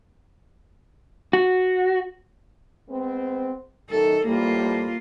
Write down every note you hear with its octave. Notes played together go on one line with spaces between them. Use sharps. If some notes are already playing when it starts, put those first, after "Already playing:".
F#4
G#3 B3 C4
F#2 D#3 A4
A2 F3 G3 A#3 F4